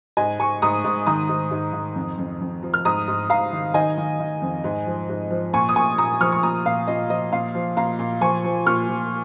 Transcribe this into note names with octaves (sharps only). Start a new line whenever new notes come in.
G#2 D#5 G#5
G#2 G#5 C#6
G#2 A#5 D#6
G#2
D#3 A#5 D#6
G#2
G#2
D#3
F2
F2
F2
F3
F6
G#2 A#5 D#6
G#2
G#2 F5 A#5
D#3
D#3 D#5 G#5
D#3
D#3
F2
G#2
F3
G#2
F3
A#2 G#5 C#6
D#6
A#2 G#5 C#6
A#2 A#5 D#6
F3 C#6 F6
C#6
A#2 A#5 D#6
A#2 F5
A#2 D#5
F3 D#5
A#2 F5
F3
A#2 F5 A#5
A#2
F3 G#5 C#6
F3
A#2 C#6 F6
F3